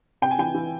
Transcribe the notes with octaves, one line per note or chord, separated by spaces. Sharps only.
C3 G5
G#5
E3 G5
E3